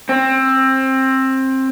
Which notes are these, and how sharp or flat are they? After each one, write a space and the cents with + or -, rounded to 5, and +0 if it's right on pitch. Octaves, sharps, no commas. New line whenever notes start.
C4 +20